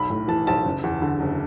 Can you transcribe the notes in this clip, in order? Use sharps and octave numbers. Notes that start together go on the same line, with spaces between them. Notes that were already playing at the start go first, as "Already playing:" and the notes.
Already playing: B1 B5
A2
E3 A5
B1 A5
F#1
E2
D3
F#1